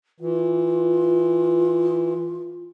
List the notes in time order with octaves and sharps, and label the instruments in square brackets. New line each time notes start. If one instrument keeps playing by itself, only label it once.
[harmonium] E3 [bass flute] F4